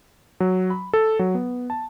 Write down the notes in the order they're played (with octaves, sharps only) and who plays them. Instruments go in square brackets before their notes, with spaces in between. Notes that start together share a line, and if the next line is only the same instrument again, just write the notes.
[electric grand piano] F#3
B5
A4
F#3
B3
A5